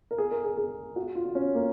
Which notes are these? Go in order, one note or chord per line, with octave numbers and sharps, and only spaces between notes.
A#4
G#4
A#4
G#4
G#4
F#4
F4
F4
C#4
A#3